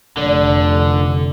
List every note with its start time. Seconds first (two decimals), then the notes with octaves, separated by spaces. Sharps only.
0.17 F1 D3 D5